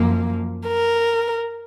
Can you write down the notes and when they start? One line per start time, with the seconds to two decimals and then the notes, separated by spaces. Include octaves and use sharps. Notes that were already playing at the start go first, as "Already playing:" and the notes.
Already playing: F#2 F3 A#3
0.68 A#4